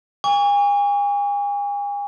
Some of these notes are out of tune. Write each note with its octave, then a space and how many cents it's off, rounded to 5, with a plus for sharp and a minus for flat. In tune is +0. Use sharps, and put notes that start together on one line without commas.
G#5 -40 C#6 +40